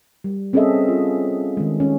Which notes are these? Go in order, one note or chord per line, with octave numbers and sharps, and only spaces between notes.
G3
C4 C#4 G#4 A4 D#5 E5
F4
D#3 G#3
C#4